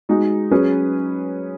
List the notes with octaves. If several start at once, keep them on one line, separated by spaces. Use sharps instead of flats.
G#3 D#4 F#4
F#3 C#4 G#4 B4